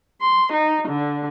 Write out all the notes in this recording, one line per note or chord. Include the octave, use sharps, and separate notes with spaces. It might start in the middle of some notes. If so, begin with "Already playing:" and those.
C6
D#4
D3